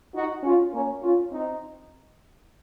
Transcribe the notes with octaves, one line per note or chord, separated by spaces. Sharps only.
D#4 F#4
C#4 F4
A#3 C#4
C#4 F4
C4 D#4